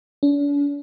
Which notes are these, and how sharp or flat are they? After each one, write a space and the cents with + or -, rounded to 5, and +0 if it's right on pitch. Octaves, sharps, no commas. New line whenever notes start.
D4 -45